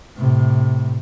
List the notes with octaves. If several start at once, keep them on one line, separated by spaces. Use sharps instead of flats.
A2 C3